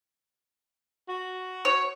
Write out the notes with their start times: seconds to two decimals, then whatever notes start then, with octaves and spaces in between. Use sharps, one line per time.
1.09 F#4
1.65 C#5